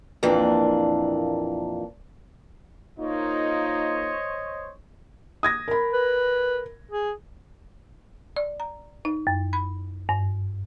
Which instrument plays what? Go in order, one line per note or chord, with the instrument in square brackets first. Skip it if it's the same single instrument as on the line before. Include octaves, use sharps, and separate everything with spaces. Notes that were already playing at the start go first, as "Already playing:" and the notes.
[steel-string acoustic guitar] F2 A#2 E3 A#3 D4
[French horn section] A#3 D#4 F4 [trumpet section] C5 C#5 D#5
[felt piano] D#6 G#6 A#6
A#4 B5
[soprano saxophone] B4
G#4
[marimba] D5
A#5
D#4
F#2
B5
G2